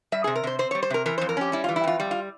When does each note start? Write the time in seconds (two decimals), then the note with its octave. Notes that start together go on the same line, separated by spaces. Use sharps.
0.12 G3 E5
0.24 G#4
0.27 C3
0.35 A#4
0.43 C3 C5
0.59 C4 C5
0.71 C#5
0.75 G3
0.82 C5
0.90 C3 A#4
1.06 E3 A#4
1.18 C5
1.21 F2
1.29 A#4
1.37 C#4 G4
1.52 G3 E4
1.64 F4
1.69 E3
1.76 E4
1.84 F2 F4
2.00 G3
2.11 F4